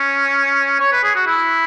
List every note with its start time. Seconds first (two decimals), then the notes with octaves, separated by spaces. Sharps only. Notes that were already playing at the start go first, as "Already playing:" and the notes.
Already playing: C#4
0.80 C#5
0.93 B4
1.03 G#4
1.16 F#4
1.27 E4